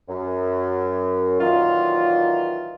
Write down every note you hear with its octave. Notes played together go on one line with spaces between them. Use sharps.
F#2
A#2 D#3 E3 F#3 F4